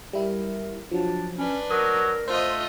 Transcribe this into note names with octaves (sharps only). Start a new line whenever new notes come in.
G3 E4 A#4
F3 F#3 D4
C#4 D4 B4
F#3 A#4 D#6
A3 F4 C5 D#5